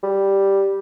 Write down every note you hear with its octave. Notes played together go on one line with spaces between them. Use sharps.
G3